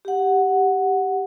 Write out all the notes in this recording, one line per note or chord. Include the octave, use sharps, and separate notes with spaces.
G4 F#5